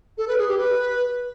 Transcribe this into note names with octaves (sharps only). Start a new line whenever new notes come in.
A4
B4
G#4
G4
B4